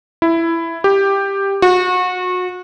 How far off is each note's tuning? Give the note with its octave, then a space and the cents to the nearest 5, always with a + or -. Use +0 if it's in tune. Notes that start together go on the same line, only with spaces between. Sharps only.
E4 +10
G4 +5
F#4 -30